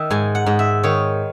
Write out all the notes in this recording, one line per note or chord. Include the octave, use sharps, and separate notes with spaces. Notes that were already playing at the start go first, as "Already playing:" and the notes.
Already playing: D#3 E5
G#2 G#5
F#5
G#2
E5
D#3 C#5